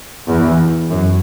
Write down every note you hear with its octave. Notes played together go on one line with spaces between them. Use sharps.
E2
F#2